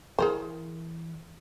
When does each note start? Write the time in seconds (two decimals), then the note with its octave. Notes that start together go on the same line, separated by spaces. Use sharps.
0.18 E3 G#4 A#4 C5